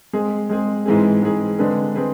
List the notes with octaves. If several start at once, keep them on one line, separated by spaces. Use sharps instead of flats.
G#3 C4 G#4
G#3 C4 G#4
G#2 E3 G#3 C4 G#4
G#2 E3 G#3 C4 G#4
D3 G#3 C4 G#4 B4
G#3 C4 G#4 B4